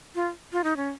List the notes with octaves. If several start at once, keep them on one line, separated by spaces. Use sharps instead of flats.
F4
F4
D#4
C#4